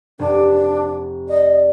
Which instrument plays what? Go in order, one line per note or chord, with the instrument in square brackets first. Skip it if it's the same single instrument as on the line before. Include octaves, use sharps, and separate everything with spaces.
[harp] F1 [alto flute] D4
[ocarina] D5 [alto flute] D#5